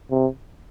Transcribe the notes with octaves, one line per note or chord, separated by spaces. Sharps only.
C3